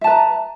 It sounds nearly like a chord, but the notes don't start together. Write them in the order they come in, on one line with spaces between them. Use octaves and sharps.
E5 A5 B4 A#5